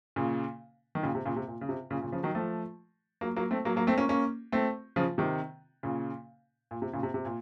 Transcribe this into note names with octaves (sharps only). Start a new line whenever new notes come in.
A#2 C#3
D#3
A#2 C#3
C3
A#2 C#3
C3
A#2
C#3
C3
A#2 C#3
A#2 C#3
C#3 F3
D#3 F#3
F3 A3
F#3 A#3
F#3 A#3
A3 C4
F#3 A#3
F#3 A#3
A3 C4
A#3 C#4
A#3 C#4
A3 C4
C#3 F3
C3 D#3
A#2 C#3
A#2
C3
A#2 C#3
C3
C3
A#2